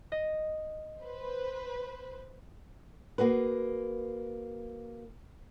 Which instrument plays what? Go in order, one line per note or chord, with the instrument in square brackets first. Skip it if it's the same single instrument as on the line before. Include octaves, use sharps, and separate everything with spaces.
[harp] D#5
[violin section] B4 C5
[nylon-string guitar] A#3 F#4 G#4 B4